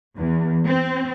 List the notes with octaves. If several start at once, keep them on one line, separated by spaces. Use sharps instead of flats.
E2
C4